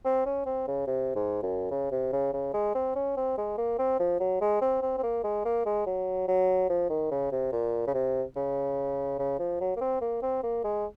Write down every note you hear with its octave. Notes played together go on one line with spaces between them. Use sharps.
C4
C#4
C4
C#3
C3
G#2
F#2
C#3
C3
C#3
C#3
G#3
C4
C#4
C4
G#3
A#3
C4
F3
F#3
G#3
C4
C4
C4
A#3
G#3
A#3
G#3
F#3
F#3
F3
D#3
C#3
C3
A#2
C#3
C3
C#3
C#3
F3
F#3
A#3
C4
A#3
C4
A#3
G#3